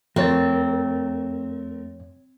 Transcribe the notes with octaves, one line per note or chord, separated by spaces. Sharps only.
F2 A3 C4 A#4 C#5 A6